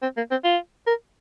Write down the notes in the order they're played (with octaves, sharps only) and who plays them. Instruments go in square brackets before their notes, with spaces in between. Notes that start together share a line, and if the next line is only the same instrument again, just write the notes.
[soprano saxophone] C4
A#3
C4
F4
A#4